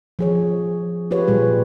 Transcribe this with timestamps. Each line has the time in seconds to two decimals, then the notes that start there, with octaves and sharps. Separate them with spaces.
0.19 F3 G#4 C#5
1.11 F4 G4 B4 C#5
1.28 A#2 G3 G#4